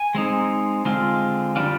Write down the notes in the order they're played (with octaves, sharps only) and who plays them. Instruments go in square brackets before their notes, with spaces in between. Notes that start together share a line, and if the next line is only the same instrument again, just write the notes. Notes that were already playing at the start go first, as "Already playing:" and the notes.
Already playing: [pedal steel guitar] G#5
G#3 C4 D#4
D3 G#3 C4 F4
D3 G3 A#3 D4 F4